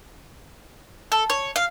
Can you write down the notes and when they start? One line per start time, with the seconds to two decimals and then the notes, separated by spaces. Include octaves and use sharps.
1.12 A4
1.30 C#5
1.56 F5